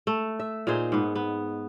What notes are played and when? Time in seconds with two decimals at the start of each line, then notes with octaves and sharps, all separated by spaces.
0.07 A3
0.39 E5
0.67 A#2 D#4 G#4 C5
0.92 G#2 B3
1.15 B3